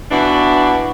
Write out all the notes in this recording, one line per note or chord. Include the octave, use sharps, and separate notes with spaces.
B2 E3 D4 F#4